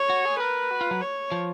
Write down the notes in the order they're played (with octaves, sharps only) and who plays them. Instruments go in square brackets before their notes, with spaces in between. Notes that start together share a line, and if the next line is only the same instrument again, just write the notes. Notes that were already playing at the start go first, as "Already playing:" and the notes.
Already playing: [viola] C#5
[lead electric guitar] F#4
G#4
[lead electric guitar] A#4 [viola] B4
[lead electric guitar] F#4
F4
F#3
[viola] C#5
[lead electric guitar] F3